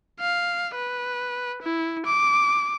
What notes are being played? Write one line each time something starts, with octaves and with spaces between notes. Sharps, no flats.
F5
B4
E4
D6